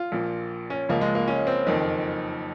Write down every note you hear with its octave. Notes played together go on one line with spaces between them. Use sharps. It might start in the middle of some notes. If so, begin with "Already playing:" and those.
Already playing: F4
A#1 A#2 F3
C#4
C#2 C#3 F3 A#3
G#3
A#3
C#4
C4
F#1 F2 D#3